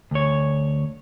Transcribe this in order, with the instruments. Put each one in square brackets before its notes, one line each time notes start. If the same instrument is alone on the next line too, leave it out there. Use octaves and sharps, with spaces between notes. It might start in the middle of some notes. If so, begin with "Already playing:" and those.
[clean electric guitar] D2 C#5